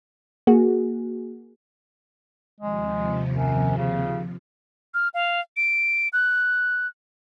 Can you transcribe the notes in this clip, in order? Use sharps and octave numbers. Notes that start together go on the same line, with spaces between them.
A#3 F#4 G#4
D#2 C3 F3 G#3
F#2
C#3
F6
F5
D7
F#6